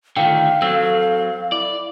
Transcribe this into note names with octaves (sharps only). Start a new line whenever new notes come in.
D3 D#3 A3 F4 F5 G5
F#3 C4 A4 E6
E4 D5